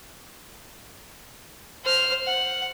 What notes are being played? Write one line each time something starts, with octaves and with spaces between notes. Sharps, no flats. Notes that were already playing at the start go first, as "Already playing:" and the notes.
C5 F6
F#5